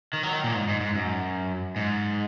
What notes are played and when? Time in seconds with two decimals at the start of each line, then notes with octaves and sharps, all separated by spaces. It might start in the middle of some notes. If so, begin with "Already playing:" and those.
0.13 D#3
0.23 F#3
0.33 D#3
0.44 A#2
0.54 G#2
0.68 G#2
0.80 G#2
0.95 F#2
1.76 G#2